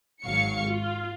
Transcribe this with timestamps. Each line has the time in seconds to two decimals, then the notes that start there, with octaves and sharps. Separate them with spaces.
0.23 G#1 F#3 F5 C#6 C#7
0.68 F4